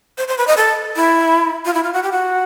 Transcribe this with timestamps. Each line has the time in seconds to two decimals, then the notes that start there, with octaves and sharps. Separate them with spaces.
0.18 C5
0.28 C5
0.38 B4
0.47 D#5
0.57 A4
0.96 E4
1.65 F4
1.74 E4
1.84 F4
1.93 F#4
2.03 G4
2.12 F#4